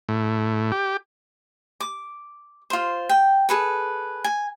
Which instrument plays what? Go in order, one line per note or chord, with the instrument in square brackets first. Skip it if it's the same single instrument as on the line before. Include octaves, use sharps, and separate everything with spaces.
[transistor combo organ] A2
G4
[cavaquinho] D6
F4 C5
G5
G#4 A4 B4
G#5